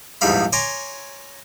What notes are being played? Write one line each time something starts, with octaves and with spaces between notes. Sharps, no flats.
A#1 E2 G#2 G3 F5 B5
C#5 G#5 A#5 C6 D6